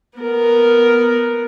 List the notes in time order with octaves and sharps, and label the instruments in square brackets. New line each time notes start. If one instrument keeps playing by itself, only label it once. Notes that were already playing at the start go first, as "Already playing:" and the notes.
[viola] B3 A#4